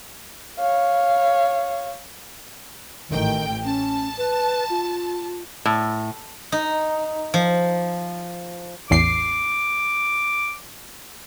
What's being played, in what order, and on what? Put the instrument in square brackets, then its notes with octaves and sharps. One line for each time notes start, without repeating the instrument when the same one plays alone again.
[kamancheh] C#5 F5
[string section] A1 G5 [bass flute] D#3
[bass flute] C#4 [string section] A5
[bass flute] B4
F4
[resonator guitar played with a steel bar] A2
[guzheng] D#4
F3
[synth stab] A1 E2 C7 [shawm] D6